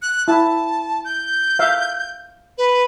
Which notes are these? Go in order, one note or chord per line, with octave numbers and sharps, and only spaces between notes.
F#6
E4 A5
G6
E5 F5
B4